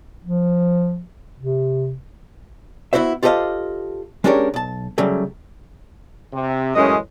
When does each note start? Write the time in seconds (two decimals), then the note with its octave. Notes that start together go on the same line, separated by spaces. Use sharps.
0.25 F3
1.39 C3
2.93 B3 E4 F#4 C5 E5
3.23 F4 G4 A4 C5 D#5 F5
4.24 G#3 C#4 D4 G4 A#4 C#5
4.54 B1 A5
4.98 C#3 F#3 G3 A3
6.32 C3
6.75 F#2 A2 E3 G#3 C#4 D#5